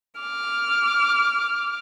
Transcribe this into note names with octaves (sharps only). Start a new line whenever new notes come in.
D6 F6